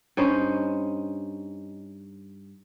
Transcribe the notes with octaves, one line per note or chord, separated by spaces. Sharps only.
G2 C#4 D#4 C5